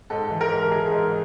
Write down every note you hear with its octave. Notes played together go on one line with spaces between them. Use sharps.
G#2 A4
E3
A#4
G#2
E3 G#4
G#2